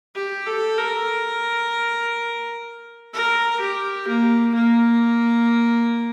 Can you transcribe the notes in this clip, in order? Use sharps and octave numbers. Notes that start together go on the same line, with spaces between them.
G4
A4
A#4
A#4
G4
A#3
A#3